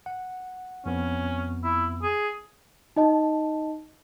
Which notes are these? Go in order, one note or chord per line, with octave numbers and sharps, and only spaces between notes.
F#5
F2 B3 C#4
E4
G#4
D#4 D#5 A5